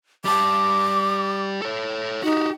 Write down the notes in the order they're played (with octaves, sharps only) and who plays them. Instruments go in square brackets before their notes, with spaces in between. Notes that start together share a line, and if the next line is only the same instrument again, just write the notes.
[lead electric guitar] G3 A5 [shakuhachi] D6
[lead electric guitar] A4 C#5
[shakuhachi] D#4 [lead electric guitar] F#4 G4